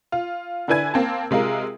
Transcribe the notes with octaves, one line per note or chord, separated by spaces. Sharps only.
F4
D3 D4 E4 B4 G#5 G#6
A#3 C4 A5
C3 G#3 F4 A#4